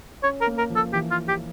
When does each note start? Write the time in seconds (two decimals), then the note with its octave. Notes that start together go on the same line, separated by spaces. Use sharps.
0.23 C#4 C#5
0.41 A#4
0.47 A#3
0.58 A#4
0.70 F3
0.76 A4
0.93 E3 G4
1.11 F4
1.28 G4